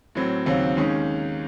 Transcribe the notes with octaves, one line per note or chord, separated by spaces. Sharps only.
A2 F#3 C4
D#2 C#3 F#3 C4
D#2 D#3 G#3 C#4